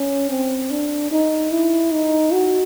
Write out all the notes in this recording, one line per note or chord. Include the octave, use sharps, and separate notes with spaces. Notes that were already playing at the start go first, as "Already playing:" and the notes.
Already playing: C#4
C4
D4
D#4
E4
D#4
F#4